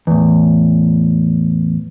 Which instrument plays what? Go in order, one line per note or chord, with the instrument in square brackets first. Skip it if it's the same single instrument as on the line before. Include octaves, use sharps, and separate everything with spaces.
[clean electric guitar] E2 A2